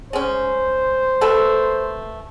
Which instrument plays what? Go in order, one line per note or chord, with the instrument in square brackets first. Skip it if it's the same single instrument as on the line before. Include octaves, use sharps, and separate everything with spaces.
[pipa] G#3 C#4 [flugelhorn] C5
[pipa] A3 A4 B4